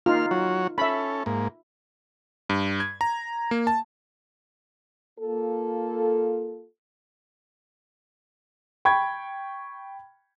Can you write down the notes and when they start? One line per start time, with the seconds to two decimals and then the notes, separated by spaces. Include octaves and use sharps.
0.06 A#3 D#4 F4 F6
0.31 F#3 F#4 C#5
0.78 C#4 A4 E5 B5
1.26 G#2 A#3
2.50 G2
2.80 G#6
3.01 A#5
3.51 A#3
3.67 A5
5.19 A#3 F4 A4
8.85 G5 B5 C#6 G#6